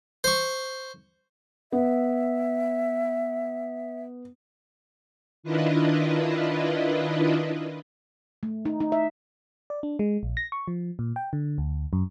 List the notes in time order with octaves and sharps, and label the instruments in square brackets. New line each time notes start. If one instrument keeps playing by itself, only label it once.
[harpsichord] C5 C#6
[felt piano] B3 [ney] E5
[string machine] D#3 D4 E4 F4 B4 D#5
[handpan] A3
D#4
D#4
E5
[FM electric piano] D5
D4
G#3
A#1
A#6
C#6
F3
A#2
G5
D3
D2
F#2